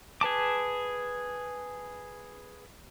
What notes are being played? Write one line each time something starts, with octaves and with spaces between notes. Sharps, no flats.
G#4 B4 A5 D6